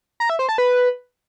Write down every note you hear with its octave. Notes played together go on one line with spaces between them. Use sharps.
A#5
E5
C5
A5
B4